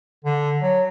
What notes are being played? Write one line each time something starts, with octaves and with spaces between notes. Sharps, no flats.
D3
F#3